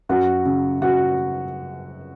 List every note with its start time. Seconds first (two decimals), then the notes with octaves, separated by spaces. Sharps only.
0.09 F#2 F#4
0.45 C#3
0.81 C#3 F#4